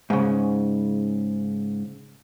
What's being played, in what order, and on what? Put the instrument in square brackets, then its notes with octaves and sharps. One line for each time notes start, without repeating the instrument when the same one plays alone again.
[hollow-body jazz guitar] G#2 C#3